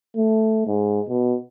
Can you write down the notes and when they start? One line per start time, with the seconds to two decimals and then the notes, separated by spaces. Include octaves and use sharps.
0.17 A3
0.67 G#2
1.09 B2